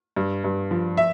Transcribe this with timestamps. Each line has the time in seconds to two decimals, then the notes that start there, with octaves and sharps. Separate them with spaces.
0.16 G2
0.44 G2
0.71 F3
0.97 E5